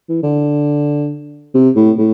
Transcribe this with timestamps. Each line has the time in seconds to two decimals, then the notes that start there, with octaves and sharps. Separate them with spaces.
0.09 E3
0.23 D3
1.54 C3
1.76 A2
1.99 A2